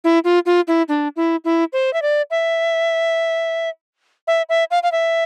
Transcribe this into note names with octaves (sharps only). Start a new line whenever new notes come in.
E4
F4
F4
E4
D4
E4
E4
C5
E5
D5
E5
E5
E5
F5
F5
E5